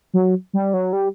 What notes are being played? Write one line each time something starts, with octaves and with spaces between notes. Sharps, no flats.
F#3
G3
F#3
G3